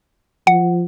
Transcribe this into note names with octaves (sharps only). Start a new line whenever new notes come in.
F3 F#5